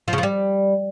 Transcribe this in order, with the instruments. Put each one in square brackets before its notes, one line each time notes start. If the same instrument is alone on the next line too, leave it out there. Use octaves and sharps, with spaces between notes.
[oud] F3
C#3
F3
G3